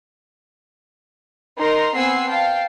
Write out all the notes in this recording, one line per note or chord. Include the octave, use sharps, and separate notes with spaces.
D#4 A#4 A#5 C6
B3 C4 F#5 G#5 E6 C7
F5 G5 A5 C7